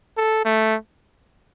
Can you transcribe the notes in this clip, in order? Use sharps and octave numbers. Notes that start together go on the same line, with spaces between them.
A4
A3